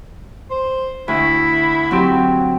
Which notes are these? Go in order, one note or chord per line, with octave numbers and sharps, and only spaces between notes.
C5
D2 E4
F#3 C4 G4